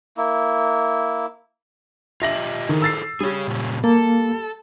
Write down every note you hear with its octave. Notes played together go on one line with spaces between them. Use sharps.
A#3 E4
F4 G4 D#5 E5 A#6 F#7
D#3 E4 G#4 A4
E6 A6 C7
G3 G#4 C#5
A#2 C#3 C#4
A#3 A4